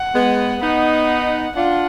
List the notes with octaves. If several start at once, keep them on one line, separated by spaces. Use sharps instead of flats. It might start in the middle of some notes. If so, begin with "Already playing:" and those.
Already playing: F#5
G#3 B3
B3 D#4 F#5
D4 F4 F#5